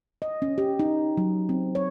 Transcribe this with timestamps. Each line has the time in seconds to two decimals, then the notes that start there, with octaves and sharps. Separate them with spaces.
0.22 D#5
0.42 C#4
0.58 G4
0.79 D#4
1.17 F#3
1.49 C4
1.75 C#5